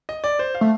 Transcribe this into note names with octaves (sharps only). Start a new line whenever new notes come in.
D#5
D5
C5
F5
A3